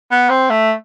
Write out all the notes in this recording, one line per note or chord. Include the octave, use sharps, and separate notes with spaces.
B3
C4
A3